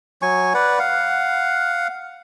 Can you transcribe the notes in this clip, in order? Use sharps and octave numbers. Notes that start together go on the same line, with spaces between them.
F#3 G#5 C#6
B4 D5 F#5
F5 F#5